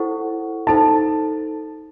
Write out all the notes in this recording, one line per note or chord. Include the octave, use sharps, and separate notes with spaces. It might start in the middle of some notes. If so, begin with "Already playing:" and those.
Already playing: E4 A4 C5 F#5 C#6
D#4 A4 C5 A5